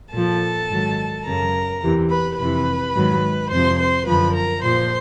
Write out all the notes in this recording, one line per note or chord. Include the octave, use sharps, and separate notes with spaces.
A#2 F3 A4 A5
G#2 D#3 F#3
F#2 C#3 F#3 A#4 A#5
E2 C3 E3
B4 B5
F2 C3 E3 B4 B5
G#2 D#3 F#3
F2 C3 F3 C5 C6
C5 C6
F#2 D3 F3 B4 B5
A#4 A#5
A#2 F3 C5 C6